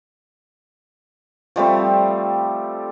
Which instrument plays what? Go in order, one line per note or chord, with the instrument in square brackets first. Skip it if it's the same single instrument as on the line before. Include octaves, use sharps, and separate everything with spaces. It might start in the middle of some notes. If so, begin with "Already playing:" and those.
[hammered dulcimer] F3 G3 A3 C4